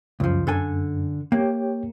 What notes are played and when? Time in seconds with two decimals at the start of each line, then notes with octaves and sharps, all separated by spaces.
0.20 C#2 F#2 F3
0.47 D3 A4 G#5
1.32 A#3 G4 C#5 G5